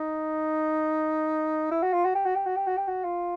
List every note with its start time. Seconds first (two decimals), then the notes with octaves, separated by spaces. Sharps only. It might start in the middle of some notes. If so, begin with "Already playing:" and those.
Already playing: D#4
1.71 E4
1.83 F#4
1.93 F4
2.05 F#4
2.15 G4
2.25 F#4
2.35 G4
2.46 F#4
2.56 G4
2.67 F#4
2.77 G4
2.88 F#4
3.04 F4